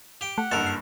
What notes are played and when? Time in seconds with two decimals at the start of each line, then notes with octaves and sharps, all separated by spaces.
0.21 G4 G5
0.38 A3 F#5
0.51 F#1 G2 A4 A#4 A6
0.67 C7